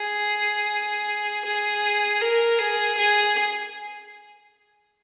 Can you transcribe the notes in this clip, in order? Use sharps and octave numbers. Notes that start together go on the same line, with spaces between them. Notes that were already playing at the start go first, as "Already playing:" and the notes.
Already playing: G#4
G#4
A#4
G#4
G#4